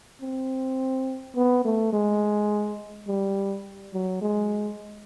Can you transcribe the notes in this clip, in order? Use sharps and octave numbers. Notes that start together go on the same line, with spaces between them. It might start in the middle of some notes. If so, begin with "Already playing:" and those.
C4
B3
A3
G#3
G3
F#3
G#3